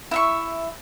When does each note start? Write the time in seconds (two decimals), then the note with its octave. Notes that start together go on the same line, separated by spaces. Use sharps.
0.11 E4 E5 C#6